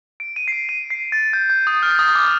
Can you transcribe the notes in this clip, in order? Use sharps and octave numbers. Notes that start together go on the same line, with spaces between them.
D7
D#7
C7
D7
D#7
C7
A6
G6
G6
D#6
F6
D#6
D6